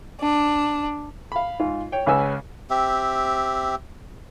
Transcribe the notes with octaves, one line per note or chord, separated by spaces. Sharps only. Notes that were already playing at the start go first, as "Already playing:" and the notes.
D4
F5 B5
G#2 F4
C#5 G5
C#2 C#3 C#4 B4 G#5 E6
C4 G4 E5